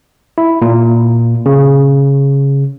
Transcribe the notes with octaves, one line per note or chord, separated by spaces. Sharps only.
E4
A#2
C#3